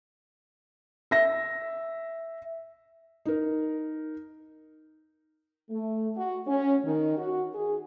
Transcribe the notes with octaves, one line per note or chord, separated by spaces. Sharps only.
E5 A#6
D#4 A#4
A3
F#4
C#4
D#3
F#4
G#4